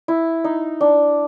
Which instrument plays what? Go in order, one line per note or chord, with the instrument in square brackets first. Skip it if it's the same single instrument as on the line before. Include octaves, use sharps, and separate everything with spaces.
[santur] E4
D#4
D4